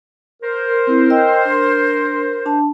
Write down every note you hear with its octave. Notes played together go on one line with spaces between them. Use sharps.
A#4 C5
C4 E4
D#5 G5 E6
D4
D4 A5